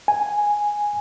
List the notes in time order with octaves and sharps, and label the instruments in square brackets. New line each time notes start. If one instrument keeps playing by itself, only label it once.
[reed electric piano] G#5